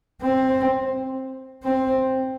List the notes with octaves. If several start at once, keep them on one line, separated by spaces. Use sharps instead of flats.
C4
C4